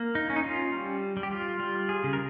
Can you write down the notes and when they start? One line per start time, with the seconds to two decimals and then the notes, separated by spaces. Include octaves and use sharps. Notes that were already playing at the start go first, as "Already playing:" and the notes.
Already playing: A#3
0.15 D#4
0.30 C#4
0.36 D#4
0.44 F4
0.73 G3
1.17 G3
1.23 G4
1.31 F4
1.59 G3 F4
1.89 G#4
2.04 C#3
2.13 A#4